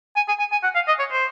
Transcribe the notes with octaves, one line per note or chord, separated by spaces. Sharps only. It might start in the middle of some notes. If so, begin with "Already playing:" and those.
G#5
G#5
G#5
G#5
F#5
F5
D#5
C#5
C5